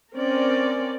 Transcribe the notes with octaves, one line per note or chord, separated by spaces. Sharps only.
C4 C#4 A#4 D5